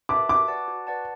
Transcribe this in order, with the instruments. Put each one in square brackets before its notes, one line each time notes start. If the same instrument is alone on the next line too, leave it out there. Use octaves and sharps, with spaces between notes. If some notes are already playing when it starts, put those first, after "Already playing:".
[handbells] B4 E5 A5 [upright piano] D6
[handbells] F#4 [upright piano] D6
[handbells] B4 D5 F#5 A5
F#4
B4 D5 F#5 A5